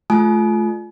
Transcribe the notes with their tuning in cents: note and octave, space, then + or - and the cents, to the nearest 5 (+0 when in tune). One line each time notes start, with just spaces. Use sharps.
A3 -30 F4 +0 G#5 +45